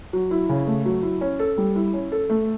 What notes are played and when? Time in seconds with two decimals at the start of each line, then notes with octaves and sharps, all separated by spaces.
0.13 F#3
0.31 E4
0.49 C#3
0.67 A3
0.86 F#3
1.03 E4
1.21 C#4
1.39 A4
1.58 G3
1.76 E4
1.94 C#4
2.12 A4
2.30 A3